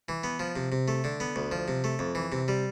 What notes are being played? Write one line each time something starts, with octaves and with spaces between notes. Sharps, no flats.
E3
B3
F3
C3
C3
A3
D3
B3
D2
F3
C3
A3
F2
E3
C3
G3